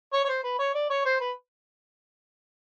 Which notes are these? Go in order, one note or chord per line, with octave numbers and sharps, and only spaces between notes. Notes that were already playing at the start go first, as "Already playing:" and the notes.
C#5
C#5
C5
B4
C#5
D5
C#5
C5
B4